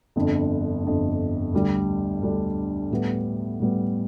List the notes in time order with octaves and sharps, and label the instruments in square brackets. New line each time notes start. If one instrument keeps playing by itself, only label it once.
[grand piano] G1 F2 D3
G1 F2 D3
D2 D3 G3 D4
D2 D3 G3 D4
A2 G3 B3
A2 G3 B3